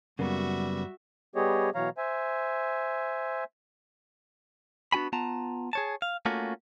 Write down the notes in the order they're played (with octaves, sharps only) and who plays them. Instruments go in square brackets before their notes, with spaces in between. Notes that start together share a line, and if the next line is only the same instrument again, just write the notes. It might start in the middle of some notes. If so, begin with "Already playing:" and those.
[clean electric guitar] F#2 [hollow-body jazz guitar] C#3 A#3 B3 [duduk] G3 [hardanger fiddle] F#4 E5
[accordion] G3 B3 G4 G#4 C#5 D#5
B2 E3 F#3 C#5 F5 A#5
C5 E5 G#5
[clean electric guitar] B3 D4 F#4 G#5 B5
B3 F4 A5 A#5
G#4 C#5 A5
F5
A3 A#3 C#4 F4 F#4